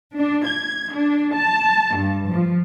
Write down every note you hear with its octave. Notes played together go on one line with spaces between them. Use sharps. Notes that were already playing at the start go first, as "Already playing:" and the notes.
D4
G#6
D4
A5
G2
F3